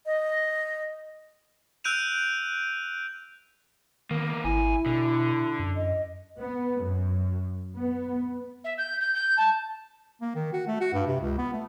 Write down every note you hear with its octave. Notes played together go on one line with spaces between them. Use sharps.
D#5
E6 F#6 G6 D7 D#7 F7
D#3 A#3 B3
G#1 E4 G#5
B2 D3
F#2
D#5
B3
F#2
B3
E5
G6
G6
G6
A5
A#3
D#3
F#4
A3
F#4
G2
C3
C#2
B3
A3